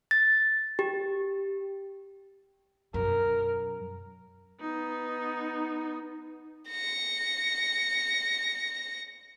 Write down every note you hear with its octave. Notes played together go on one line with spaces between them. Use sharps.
A6
G4
F#2 B2 A#4
B3 D#4
A#6 C#7